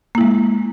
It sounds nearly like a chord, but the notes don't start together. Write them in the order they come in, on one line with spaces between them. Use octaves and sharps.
A#3 E4 G#3